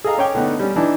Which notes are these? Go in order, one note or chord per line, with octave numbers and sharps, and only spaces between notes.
G#4 A4 D#5 F5 A#5
C#4 C#5 G5 D6
D3 A3 B3 D#4
G3 C#4
E3 D4 D#4